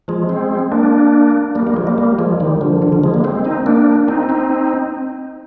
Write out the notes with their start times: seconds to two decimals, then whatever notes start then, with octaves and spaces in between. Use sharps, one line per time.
0.08 F3 G#3
0.29 G#3 C4
0.72 A#3 D4
1.55 G3 A#3
1.66 G3 A#3
1.77 F3 G#3
1.87 G3 A#3
1.98 G3 A#3
2.19 F3 G#3
2.40 D#3 G3
2.61 D3 F3
2.82 D3 F3
2.92 D3 F3
3.03 F3 G#3
3.14 G3 A#3
3.24 G#3 C4
3.45 C4 D#4
3.66 A#3 D4
4.08 C4 D#4
4.29 C4 D#4